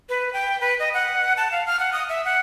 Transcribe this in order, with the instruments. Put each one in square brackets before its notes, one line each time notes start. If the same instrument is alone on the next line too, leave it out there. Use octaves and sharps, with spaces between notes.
[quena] B4
G5
B4
D#5
F#5
A5
F5
F6
F#5
D#6
E5
F#5